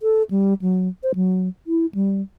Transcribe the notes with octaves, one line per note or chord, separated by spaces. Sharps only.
A4
G3
F#3
C5
F#3
E4
G3